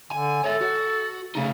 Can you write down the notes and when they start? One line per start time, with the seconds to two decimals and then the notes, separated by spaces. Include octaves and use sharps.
0.11 D3 G#5
0.44 A4 C#5 E5
0.61 F#4
1.35 C#3 A3 D#4